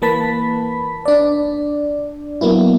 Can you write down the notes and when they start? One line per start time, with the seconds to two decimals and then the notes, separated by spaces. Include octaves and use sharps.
0.02 E3 A#3 B4 A5 B5 B6
1.05 D4 D5
2.41 F#3 A#3 B3 E4